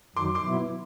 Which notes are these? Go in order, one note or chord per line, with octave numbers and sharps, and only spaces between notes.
F#2 D#3 F#3 C6 D6
C6 D6
B2 F#3 B3 E4